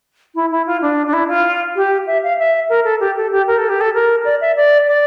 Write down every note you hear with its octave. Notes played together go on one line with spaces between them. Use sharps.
E4
E4
F4
D4
D4
E4
F4
G4
E5
F5
E5
A#4
A4
G4
A4
G4
A#4
A4
G4
A4
A#4
D5
E5
D5
D5